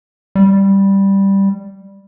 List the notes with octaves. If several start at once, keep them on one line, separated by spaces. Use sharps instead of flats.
G3